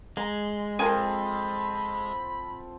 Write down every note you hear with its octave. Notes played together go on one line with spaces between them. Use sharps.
G#3 A#5
F3 C4 A4 A#4 G#5 B5